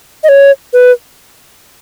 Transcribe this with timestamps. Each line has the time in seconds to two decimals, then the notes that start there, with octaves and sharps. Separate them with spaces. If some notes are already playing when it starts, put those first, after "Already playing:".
0.24 D#5
0.29 C#5
0.73 B4